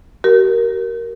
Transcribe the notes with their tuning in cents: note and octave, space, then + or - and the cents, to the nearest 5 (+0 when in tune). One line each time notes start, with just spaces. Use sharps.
G4 -45 A#4 +0